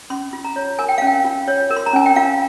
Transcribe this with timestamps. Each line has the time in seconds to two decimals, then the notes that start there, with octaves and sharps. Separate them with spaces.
0.10 C#4 C6
0.33 F4
0.45 A#5
0.56 C#5
0.79 A#4 G#5
0.89 G5
0.98 C#4 F5
1.07 G5
1.24 F4
1.48 C#5
1.71 A#4
1.77 C6
1.86 A#5
1.93 C#4 G#5
2.06 G5
2.16 F4 F5